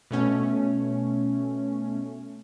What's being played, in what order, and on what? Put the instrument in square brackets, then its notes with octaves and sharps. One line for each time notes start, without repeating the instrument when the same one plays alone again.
[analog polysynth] B2 A3 C#4